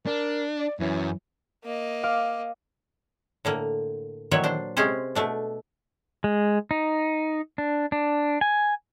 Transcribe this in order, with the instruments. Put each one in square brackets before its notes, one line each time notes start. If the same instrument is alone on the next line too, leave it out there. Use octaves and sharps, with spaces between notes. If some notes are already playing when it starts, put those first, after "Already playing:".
[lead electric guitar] D4 [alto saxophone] A#4
[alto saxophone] D5
[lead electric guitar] F#2 C#4 [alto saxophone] E3
[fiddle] A#3 D#5
[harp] F5 D6
[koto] A2 D3 A#3
A#2 D#3 E3 F#3 B3 C#5
D4 C5
C3 G#3 C#4 G#4 C5
B2 A3 D4
[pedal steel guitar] G#3
D#4
D4
D4
G#5